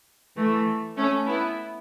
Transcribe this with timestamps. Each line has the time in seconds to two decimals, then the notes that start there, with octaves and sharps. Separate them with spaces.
0.37 E3 A3
0.97 A3 C#4
1.27 B3 E4